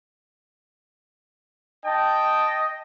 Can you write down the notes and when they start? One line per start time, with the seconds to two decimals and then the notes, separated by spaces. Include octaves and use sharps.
1.85 D#5 G5 A5